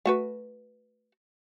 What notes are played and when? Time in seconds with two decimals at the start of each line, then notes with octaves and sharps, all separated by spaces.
0.06 A3 F#4 B4